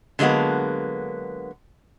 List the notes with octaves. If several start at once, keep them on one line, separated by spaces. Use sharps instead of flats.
D3 F#3 G#3 A#3 B3